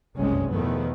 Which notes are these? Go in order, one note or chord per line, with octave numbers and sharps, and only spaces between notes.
F#1 C2 G2 C3 G#3 C#4
E2 B2 D#3 F3 A3 B3